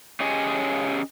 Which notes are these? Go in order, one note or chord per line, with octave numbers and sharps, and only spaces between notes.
C#4 G4 G#4 C#5 D#5